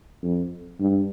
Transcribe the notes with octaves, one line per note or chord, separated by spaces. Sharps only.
F2
G2